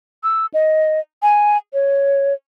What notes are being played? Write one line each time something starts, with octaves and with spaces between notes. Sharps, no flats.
E6
D#5
G#5
C#5